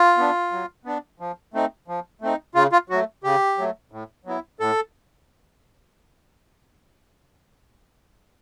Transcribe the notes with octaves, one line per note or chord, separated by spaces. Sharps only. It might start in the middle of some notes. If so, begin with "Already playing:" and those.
Already playing: F4
B3 D4
F#3
B3 D4
F3
A3 C4 D#4
F3
A3 C4 D#4
C#3 F4
F4
F#3 A3 F#4
C#3 G4
F#3 A3
A2
F#3 B3 E4
A2 A4